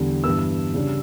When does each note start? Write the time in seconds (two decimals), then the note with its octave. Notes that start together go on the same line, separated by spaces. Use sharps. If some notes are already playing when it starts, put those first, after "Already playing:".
Already playing: E2 D3 G3
0.24 G2 E3 B3 E6
0.74 C#3 G3 D4